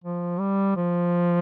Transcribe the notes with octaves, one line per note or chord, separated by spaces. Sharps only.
F3
G3
F3